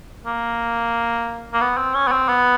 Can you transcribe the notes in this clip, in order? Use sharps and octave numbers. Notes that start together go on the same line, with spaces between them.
A#3
A#3
B3
C4
C#4
B3
C4
B3